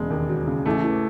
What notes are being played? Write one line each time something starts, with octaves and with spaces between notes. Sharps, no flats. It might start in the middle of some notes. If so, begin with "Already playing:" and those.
Already playing: E1 C#3 G#3
D#2
F#3
C#3
A1 A3
E3